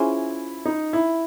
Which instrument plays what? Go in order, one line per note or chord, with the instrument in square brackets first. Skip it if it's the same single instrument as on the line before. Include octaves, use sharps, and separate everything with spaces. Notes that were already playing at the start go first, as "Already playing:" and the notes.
Already playing: [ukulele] C#4 F4 G#4 C5 [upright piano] E4
[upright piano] D#4
E4